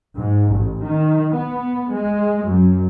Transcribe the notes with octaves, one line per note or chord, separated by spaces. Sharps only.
G#2
A1
D#3
B3
G#3
F#2